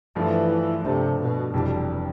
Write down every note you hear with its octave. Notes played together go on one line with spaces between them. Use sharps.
G2 E3 F3 A3 D4
G2 C3 F3 A3 D4
B2
F1 F2 B2 E3 G3 D4